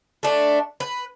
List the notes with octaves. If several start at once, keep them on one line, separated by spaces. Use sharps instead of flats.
A3 D4
B4